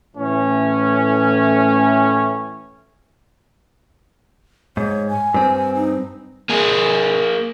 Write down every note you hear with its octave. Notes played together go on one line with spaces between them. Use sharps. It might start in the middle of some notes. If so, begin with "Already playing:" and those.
A2 E3 C#4
G#2 C#5
G#5
G2 C4
D#4
A#3 G#4